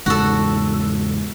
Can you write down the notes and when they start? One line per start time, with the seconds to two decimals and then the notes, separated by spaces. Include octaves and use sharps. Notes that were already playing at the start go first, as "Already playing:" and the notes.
0.06 E2 G#2 C#3 F#4 A4